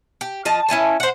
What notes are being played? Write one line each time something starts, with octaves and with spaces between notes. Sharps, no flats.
G4
F3 D#5 A5
C#4 E4 G#5 A5
C5 F#5